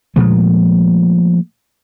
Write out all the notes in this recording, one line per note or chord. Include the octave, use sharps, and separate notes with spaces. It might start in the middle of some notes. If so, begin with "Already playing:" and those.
A#2 F3 G#3 A3